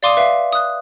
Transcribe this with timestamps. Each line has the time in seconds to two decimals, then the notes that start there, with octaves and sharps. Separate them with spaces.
0.03 D5 F5 C6 D6 D#6 D#7
0.17 B4 E5 F5
0.53 D#6 F#6